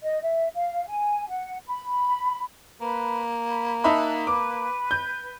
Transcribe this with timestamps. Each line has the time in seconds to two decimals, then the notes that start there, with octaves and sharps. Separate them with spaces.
0.04 D#5
0.22 E5
0.55 F5
0.88 G#5
1.29 F#5
1.67 B5
2.81 A#3 B4 B5
3.48 B5
3.84 D#4 E5 A5 B5 F#6
4.27 B4 D6
4.91 G6